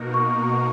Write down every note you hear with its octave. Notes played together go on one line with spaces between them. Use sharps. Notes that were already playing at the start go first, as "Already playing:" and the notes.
Already playing: B2 A#3 D#4 F#4 A#4
C#6
C#6